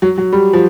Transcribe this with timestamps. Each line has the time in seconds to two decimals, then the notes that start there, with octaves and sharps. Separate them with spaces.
0.02 F#3
0.18 F#3
0.33 G3
0.53 F3